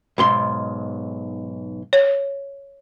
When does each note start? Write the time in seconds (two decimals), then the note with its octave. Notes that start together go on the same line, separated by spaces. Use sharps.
0.18 B1 G#2 C6
1.93 C#5